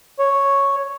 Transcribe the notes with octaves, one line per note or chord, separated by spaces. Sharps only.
C#5